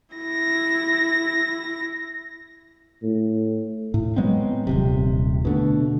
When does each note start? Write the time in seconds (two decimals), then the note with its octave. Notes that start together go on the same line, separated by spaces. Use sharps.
0.16 E4 A#6
3.03 A2
3.94 A2
4.16 F#3 G#3 B3 C4
4.67 D#1 G#1 C3
5.45 B2 D3 A3